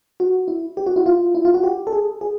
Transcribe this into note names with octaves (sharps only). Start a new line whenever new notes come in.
F#4
E4
G4
F#4
E4
F4
E4
F4
F#4
G4
A4
G#4
G#4